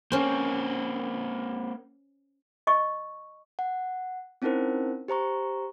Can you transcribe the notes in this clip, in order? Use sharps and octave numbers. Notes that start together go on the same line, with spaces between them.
A#3 C4 C#4 C5
D#5 C#6
F#5
C4 C#4 D#4 E4 A#4 C5
G4 C5 A#5 C#6